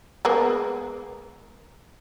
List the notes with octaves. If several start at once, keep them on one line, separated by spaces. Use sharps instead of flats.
G#3 A#3 B3